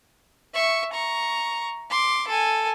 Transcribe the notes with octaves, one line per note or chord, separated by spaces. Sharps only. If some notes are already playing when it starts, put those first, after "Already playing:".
E5 C#6
A#5 C#6
C6 D6
A4 G#5